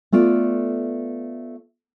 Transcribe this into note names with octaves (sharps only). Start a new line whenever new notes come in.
A3 B3 F4 D5